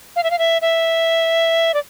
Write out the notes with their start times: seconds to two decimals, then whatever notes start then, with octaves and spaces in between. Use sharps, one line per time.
0.16 F5
0.23 E5
0.31 F5
0.39 E5
0.62 E5
1.74 D5